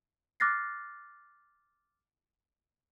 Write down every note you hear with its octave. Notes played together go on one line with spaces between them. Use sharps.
D6 F6 F#6 A6 A#6 C7